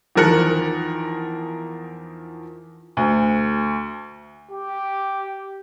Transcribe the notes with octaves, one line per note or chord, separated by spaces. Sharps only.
E2 D#3 F3 A#4 F#6 C#7
D2
G4